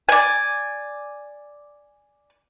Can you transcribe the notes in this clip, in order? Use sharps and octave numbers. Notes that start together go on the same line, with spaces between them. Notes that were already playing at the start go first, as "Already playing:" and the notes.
D5 G#5